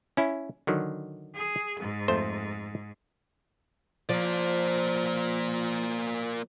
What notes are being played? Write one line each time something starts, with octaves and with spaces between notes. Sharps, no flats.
C#4 E4
D3 D#3 F#3
G#4
G#2
F2 A3 C5
F3 A#3 D5